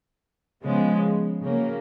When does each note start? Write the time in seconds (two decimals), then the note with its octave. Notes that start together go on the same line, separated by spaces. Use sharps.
0.64 C#3 F3 G#3 B3
1.43 C#3 F#3 A#3